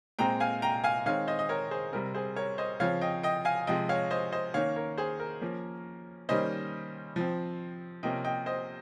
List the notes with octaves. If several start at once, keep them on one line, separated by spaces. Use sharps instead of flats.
A#2 G#3 C4 G5 A#5
F5 G#5
G5 A#5
F5 G#5
D#3 G#3 C4 C#5 F5
C5 D#5
D#5
A#4 C#5
G#4 C5
C3 G3 C4 A#4
G#4 C5
A#4 C#5
C5 D#5
C#3 F3 C4 C#5 F5
D#5 G5
D#5 G5
F5 G#5
C3 F3 G#3 D#5 G5
C#5 F5
C5 D#5
C5 D#5
D#3 A#3 C#4 C#5 F5
A#4 C#5
G#4 C5
A#4
F3 A#3 C#4
D#3 G3 A#3 C#4 C5 D#5
F3 C4
C3 F3 A#3 C#4 D#5 G5
D#5 G5
C5 D#5